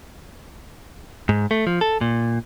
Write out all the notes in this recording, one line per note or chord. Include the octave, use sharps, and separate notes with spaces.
G#2
A3
F3
A4
A#2